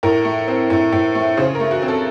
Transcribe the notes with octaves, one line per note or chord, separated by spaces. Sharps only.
A2 A#4
A3
C4
A2
A2
A3
C#3 C5
A#4
A3
F#4
C4
A4